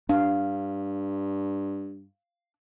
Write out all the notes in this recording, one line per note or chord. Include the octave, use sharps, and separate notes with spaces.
G2 D4 F5